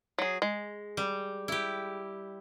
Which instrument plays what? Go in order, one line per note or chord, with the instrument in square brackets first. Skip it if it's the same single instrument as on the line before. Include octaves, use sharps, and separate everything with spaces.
[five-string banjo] F#3 G#4
G#3
[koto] G3
E4 G4